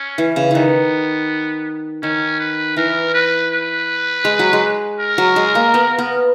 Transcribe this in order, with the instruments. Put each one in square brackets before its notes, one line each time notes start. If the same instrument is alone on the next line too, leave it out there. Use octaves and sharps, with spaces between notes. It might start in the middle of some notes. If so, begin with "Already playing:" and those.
Already playing: [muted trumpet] C#4
[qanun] E3
C#3
[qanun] D#3 E3 [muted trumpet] B3
[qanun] D#3 [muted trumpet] C#4
[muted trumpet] B4
[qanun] E3 [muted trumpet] A#4
[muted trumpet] B4
B4
[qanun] G#3
F#3
G#3
[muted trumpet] A#4
[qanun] F#3
G#3
A#3
B3
B3